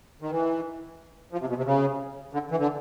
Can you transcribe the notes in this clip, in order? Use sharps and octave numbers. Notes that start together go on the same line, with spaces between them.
D#3
E3
F3
C3
B2
C3
C#3
D3
E3
D3